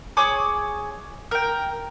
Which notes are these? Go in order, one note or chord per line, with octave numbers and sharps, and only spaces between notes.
G#4 C#5 D6 D#6
A#4 G5